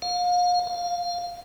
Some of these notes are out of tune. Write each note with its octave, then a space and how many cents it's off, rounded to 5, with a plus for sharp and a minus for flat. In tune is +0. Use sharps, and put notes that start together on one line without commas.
F5 +35
F5 +5